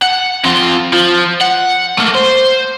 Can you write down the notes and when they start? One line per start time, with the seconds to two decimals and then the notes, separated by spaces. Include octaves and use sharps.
0.02 F#5
0.45 F2 F4
0.93 F3
1.41 F#5
1.98 A3 A#3
2.15 C5